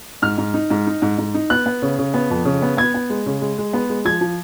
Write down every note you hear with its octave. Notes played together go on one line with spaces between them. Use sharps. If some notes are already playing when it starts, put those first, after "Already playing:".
G#2 F6
G#2
D#4
G#2
D#4
G#2
G#2
D#4
B3 F#6
B3
C#3
C#3
B3
F2
C#3
B3
B3 G#6
B3
G#3
C#3
G#3
G#3
B3
G#3
F3 G#6
F3